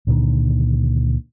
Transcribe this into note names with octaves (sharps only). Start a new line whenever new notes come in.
C#2 A#2 D3 D#3